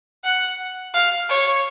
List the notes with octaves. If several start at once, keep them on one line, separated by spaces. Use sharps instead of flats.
F#5
F5
C#5